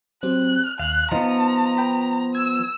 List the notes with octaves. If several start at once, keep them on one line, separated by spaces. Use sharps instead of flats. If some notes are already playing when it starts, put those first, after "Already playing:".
F#3 C4 G4 F#6
D#2 F5 F#6
F3 B3 D#4 F5 A#5
B4 G5 B5
E6 G#6